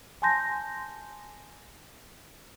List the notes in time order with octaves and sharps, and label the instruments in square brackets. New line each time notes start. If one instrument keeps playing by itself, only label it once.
[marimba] G#5 A5 C6 G6 A#6